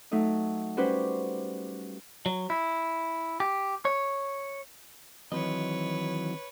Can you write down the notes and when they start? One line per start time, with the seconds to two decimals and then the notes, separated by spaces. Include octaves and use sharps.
0.11 F#3 A3 D#4
0.77 G3 C#4 F#4 G4 B4 C5
2.26 F#3
2.50 E4
3.40 G4
3.85 C#5
5.32 D#3 E3 F#3 C4 B4 C#5 D#5